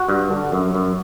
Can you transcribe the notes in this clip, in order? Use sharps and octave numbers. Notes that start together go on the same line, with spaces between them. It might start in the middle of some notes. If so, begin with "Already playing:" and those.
Already playing: F#4
G2
D3
F#2
F#2